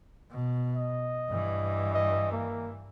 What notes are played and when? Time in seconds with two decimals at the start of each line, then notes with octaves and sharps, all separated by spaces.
0.31 B2
0.76 D#5
1.29 G2 E3
1.95 D#5
2.32 A#3